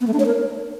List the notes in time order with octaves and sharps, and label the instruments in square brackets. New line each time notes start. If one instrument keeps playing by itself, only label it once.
[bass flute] B3
A3
D4
C#5
A#4